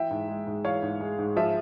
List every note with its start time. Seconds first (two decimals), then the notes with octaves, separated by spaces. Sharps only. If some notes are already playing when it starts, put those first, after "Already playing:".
Already playing: E3 E5 G5
0.11 G#2
0.28 G#3
0.47 G#2
0.65 E3 C#5 F5
0.83 G#2
1.01 G#3
1.18 G#2
1.36 F3 E5